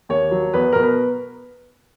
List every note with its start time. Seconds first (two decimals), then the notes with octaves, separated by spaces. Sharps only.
0.09 D#2 C#5
0.31 F#3
0.53 E2 B4
0.72 B2 A#4
0.82 B4